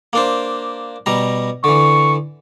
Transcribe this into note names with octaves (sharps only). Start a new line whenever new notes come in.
A#3 D4 C5
B2 G3 A#5
D3 E3 C#6